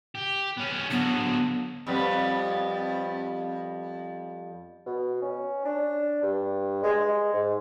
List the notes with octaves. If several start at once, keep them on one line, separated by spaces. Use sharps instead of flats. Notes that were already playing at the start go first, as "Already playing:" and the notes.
G4
B3 C#4
D3 F#3 B3
F2 G3 B3
B2
C#4
D4
G2
G#3
G#3
G#2